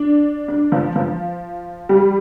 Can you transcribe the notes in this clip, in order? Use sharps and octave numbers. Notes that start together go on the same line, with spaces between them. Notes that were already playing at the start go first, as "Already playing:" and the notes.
Already playing: D4
D4
F3
F3
G3